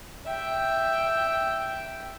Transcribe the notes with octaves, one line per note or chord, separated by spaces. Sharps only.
E5 G5